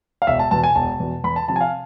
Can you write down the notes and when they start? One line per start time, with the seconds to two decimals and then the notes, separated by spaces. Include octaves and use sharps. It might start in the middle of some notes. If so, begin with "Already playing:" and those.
0.22 F5
0.27 E1 E5
0.39 A5
0.51 E2 B2 A5
0.64 G#5
0.76 E1 A5
1.00 E2 B2
1.24 E2 B5
1.36 A5
1.48 C3 F3 A5
1.56 G#5
1.61 F5